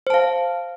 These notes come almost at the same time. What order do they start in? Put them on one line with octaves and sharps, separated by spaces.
C5 A5 F5